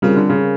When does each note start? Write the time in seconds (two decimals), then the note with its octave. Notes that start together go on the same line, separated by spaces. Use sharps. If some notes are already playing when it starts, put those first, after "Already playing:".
0.02 C#3 G3 C4 F4 A#4
0.16 D3
0.30 C#3